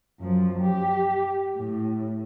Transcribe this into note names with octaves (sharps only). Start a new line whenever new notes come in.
F#2 F3
G4
A2